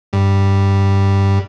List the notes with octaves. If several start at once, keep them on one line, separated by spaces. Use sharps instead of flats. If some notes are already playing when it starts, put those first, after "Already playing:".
G2